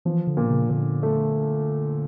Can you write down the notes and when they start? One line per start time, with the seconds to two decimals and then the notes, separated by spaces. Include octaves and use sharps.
0.05 E3 F3
0.27 D3
0.37 A#2
0.49 C#3
0.69 A#2 D3
1.03 A3